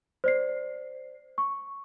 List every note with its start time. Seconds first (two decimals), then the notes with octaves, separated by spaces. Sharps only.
0.24 C5 D5 C7
1.38 C#6